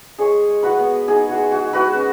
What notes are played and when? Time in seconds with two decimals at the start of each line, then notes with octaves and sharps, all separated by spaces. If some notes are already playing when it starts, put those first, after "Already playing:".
0.19 G#3 G#4 C#5
0.49 G#3
0.63 F#4 B4
0.79 B3
1.07 D#4 G#4
1.30 F#4
1.36 G#3
1.51 F#4
1.66 G#3
1.73 F#4 B4
1.96 C#4